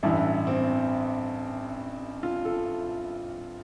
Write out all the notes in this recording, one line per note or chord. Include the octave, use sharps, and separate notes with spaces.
A1 G2 E3 E4
C4
F4
A4